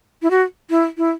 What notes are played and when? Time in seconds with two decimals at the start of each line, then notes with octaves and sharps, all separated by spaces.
0.22 E4
0.31 F#4
0.70 E4
0.98 E4